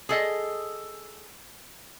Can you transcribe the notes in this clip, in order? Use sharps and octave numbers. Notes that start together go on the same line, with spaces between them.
G#4 A4 D#5